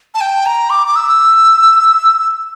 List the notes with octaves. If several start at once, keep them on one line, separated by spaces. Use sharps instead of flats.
A5
G5
A#5
D6
D6
E6